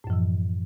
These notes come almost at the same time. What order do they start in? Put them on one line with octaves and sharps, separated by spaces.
A2 F#2 F3 E3